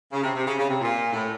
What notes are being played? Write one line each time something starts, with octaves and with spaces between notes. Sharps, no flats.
C#3
C3
C3
C#3
C#3
C3
A#2
A2